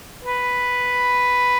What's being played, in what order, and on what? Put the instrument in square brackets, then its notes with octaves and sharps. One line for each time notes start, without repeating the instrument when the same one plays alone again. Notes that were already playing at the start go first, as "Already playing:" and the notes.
[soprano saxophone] B4